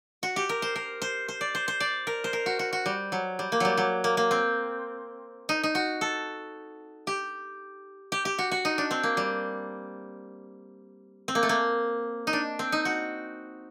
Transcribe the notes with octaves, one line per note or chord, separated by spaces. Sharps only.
F#4
G4
A#4
C5
A#4
C5
C5
D5
C5
C5
D5
A#4
C5
A#4
F#4
F#4
F#4
G3
F#3
G3
A#3
F#3 G3
F#3
A#3
A#3
C4
D#4
D#4
F#4
A4
G4
G4
G4
F#4
F#4
D#4
D4
C4
A#3
G3
C4
A#3
A3
A#3
D#4
D4
C4
D#4
F#4